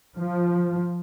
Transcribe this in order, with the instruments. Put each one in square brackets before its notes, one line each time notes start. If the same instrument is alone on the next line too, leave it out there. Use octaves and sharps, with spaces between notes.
[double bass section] F3